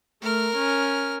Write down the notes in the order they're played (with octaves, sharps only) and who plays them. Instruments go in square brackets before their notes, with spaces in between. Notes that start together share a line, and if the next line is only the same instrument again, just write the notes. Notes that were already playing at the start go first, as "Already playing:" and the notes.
[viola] A3 [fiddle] A#4 F6
[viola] C#4